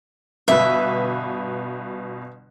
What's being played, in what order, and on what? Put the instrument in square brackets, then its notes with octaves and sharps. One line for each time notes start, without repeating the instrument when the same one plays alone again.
[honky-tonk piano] G1 B2 B4 [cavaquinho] E5